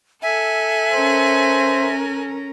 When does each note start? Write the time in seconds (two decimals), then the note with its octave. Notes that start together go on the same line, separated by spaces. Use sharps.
0.22 A4 E5 G#5 F#6
0.92 C#4 A#4 C5